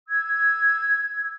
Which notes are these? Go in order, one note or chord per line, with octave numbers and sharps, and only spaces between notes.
E6 G#6